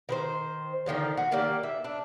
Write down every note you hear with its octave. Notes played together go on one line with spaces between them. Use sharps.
D#3 B4 C5
D3 D#3 F3 F#3
F#4
D#3 A#3 G4 D5
E5
D4